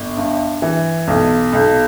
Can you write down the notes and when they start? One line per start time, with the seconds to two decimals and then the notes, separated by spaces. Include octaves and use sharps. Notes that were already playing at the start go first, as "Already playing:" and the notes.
Already playing: G1
0.17 G2
0.62 E3
1.08 B1
1.53 B1